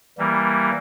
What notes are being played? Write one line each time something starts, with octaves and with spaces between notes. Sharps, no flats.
E3 G3 A#3